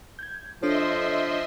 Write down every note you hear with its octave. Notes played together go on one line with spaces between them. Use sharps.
G6 G#6
F3 D4 A4 C#5 D#5 E5 C6